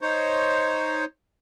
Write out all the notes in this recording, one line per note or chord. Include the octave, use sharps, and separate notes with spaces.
D#4 C5 C#5